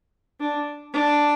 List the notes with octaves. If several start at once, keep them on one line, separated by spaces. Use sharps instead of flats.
D4
D4